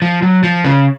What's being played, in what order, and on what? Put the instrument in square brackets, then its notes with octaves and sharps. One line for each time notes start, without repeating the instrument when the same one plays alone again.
[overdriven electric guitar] F3
F#3
F3
C#3